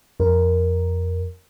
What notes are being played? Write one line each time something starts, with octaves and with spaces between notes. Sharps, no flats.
F2 A#4